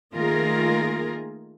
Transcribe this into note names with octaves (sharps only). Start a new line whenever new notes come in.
D#3 A3 A#3 F4 G#4 A#4